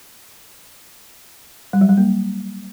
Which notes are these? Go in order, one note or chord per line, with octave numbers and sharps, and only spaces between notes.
G3
F#3
G3
A#3